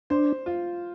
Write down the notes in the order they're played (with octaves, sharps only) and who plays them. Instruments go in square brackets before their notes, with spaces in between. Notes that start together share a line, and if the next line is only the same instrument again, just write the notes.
[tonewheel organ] D4 [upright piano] C5
[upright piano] F4